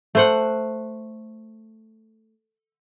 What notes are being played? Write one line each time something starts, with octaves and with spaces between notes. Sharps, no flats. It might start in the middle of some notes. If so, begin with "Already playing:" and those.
A3 C5 F#5